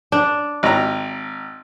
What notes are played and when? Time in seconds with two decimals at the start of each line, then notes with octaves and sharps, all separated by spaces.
0.12 D4
0.63 G#1 A#5